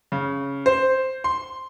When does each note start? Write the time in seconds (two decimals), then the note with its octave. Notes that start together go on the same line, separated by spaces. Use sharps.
0.12 C#3
0.66 C5
1.24 C6